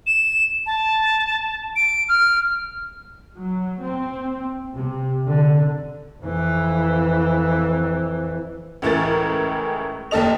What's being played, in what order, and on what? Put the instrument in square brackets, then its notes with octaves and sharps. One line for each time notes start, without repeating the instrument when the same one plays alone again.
[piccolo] E7
A5
D7
F6
[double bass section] F#3
C4
C3
D3
[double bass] F2 E3
[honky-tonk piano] C#2 A2 E3 A#4 A6
F1 D#2 A4 D#5 F7